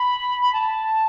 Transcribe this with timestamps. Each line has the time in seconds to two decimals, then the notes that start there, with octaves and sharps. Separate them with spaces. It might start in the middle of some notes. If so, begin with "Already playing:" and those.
Already playing: B5
0.42 B5
0.53 A5